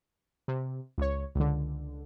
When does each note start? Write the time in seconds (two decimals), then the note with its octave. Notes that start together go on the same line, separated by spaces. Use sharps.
0.48 C3
0.98 C#2 C#5
1.35 C#2 D3